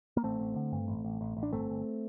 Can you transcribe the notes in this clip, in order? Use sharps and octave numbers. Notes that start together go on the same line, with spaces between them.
A#3
A1 A3 C4
A1
D3
G2
A1
A1
A1
A1
D4
G1 A3 C4
G1